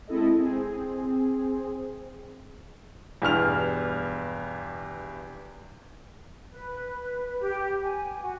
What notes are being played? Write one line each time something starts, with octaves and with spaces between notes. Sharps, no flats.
G#3 C4 E4 A4 D#5
C4 G#4
E2 G2 B2 F6 F7
B4
G4
G#5
F#4